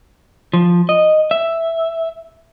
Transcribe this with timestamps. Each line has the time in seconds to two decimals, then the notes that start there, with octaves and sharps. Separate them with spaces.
0.53 F3
0.89 D#5
1.31 E5